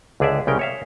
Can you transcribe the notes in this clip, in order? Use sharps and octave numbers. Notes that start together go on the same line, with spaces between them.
C#2 D3 G#4 D5 E5
C2 C#3 G#3 C#4 A#4 G5
C#5 E5 F5